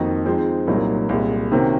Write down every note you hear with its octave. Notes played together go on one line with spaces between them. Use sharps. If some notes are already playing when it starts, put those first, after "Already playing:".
Already playing: F2 D#3 A#3 D#4 F#4
F3 G#3 C4 D#4
C2 A#2 F#3 A#3 D#4
C2 A#2 G#3
C3 D#3 A#3 C#4 F#4